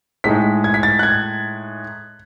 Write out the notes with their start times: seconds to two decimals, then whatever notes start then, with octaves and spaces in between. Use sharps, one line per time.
0.24 A2 G#3 D#4 B6
0.64 G#6
0.74 B6
0.83 A6
0.99 F#6
1.03 G#6